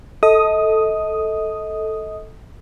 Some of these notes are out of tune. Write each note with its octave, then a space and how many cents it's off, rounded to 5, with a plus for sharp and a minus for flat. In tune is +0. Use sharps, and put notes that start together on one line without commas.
A4 +0 D#5 +30 D#6 +0